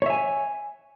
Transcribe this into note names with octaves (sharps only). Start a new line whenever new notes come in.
C#5 E5 G#5